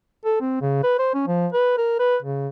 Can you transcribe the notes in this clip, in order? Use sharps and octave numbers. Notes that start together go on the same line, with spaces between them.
A4
C4
C#3
B4
C5
C#4
F3
B4
A#4
B4
C#3